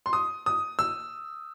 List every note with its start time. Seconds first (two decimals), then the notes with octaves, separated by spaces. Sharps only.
0.06 C6
0.13 D#6
0.46 D#6
0.79 E6